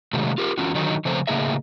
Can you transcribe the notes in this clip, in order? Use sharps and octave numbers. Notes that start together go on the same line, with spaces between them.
C3 D#3 F#3 G#3 A3
F4 G4 A#4
E2 C#4 F4 F#4
D3 D#3 F#3 D#4
C#3 F3 A3 C4 C5
A2 C#3 A#3 G#4 D#5 E5